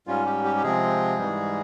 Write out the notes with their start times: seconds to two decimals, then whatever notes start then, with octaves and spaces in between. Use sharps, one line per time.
0.07 G#2 G3 C#4 F4
0.26 G4
0.44 G4
0.56 G4
0.63 C3 F3 G#3 C4 G#4
1.18 G#2 E3 G3